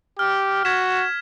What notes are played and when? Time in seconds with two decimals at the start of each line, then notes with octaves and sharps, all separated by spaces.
0.19 G4 F6
0.64 F#4 G#6 B6 E7